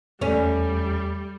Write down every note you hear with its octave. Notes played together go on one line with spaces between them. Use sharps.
E2 G3 A3 C#4